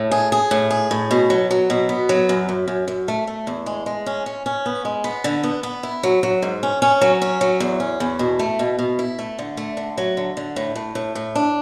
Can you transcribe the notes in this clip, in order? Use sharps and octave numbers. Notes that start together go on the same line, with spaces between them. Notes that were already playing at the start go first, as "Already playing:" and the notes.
Already playing: A2
G#4
G#4
A2
G#4
A2
B2
F#3
F#3
B2
B3
F#3
F#2
F#2
F#2
F#2
A3
A3
E2
G#3
G#3
C#4
C#4
C#4
B3
G#3
B3
D3
B3
B3
E4
F#3
F#3
G#2
C#4
C#4
F#3
C#4
F#3
E2
C#4
E2
B2
A3
B2
B2
E4
A3
D3
A3
D3
F#3
D3
D3
A2
A2
A2
A2
D4